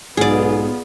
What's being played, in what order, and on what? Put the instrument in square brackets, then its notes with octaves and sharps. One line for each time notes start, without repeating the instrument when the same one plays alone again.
[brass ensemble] B1 [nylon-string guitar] G#2 [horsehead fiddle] B3 F4 [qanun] G#4 D5